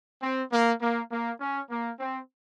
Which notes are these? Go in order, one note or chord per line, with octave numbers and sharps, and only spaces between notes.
C4
A#3
A#3
A#3
C#4
A#3
C4